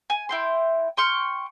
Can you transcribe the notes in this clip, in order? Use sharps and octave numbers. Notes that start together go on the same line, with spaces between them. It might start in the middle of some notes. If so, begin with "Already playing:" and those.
G#5
E4 G5 C6
G5 C6 C#6 F6